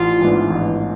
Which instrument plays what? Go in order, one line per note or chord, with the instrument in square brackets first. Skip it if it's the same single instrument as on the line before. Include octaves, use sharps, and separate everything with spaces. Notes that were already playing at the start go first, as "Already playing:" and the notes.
Already playing: [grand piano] A1 [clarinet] F4
[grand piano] G#2 E3 B3 D4
A1